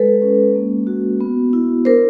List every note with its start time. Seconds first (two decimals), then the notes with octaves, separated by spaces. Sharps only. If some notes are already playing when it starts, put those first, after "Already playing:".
Already playing: G#3 A4 B4
0.22 C#4
0.55 A#3
0.87 F#4
1.21 B3
1.53 E4
1.85 D4 A#4 C5